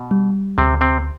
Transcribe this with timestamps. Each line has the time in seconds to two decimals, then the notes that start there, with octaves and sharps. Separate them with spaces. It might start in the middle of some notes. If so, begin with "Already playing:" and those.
Already playing: B2
0.11 G3
0.58 D2 C3 C4
0.81 C3 C4